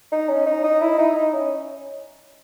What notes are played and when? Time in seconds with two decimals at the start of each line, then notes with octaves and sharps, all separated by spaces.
0.12 D#4
0.29 C#4
0.46 D#4
0.64 D#4
0.81 E4
0.98 D#4
1.16 D#4
1.33 C#4